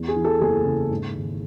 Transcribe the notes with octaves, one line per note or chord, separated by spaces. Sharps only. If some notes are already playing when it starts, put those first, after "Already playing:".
Already playing: E2
G#4
E3
A4
F#1 G#4
C#3
G#2
G#1